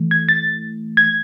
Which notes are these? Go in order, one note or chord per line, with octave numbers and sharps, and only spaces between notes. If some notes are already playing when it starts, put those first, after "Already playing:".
Already playing: E3 A3
G#6
A6
G#6